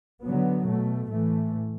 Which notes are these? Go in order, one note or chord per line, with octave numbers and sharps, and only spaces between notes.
D3 F#3 B3
B2 A3
A2 E3 A3